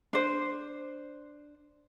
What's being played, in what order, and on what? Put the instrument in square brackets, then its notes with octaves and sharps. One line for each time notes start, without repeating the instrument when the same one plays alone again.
[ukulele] D4 C5